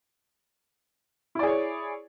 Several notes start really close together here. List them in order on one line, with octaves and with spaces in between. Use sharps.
E4 D5 G#4 C#5